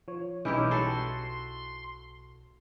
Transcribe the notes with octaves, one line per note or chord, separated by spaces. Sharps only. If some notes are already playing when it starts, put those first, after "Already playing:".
F3 C#5
B1 E3 C#4 D#4 E4 G4
F#4 A4 B4 C6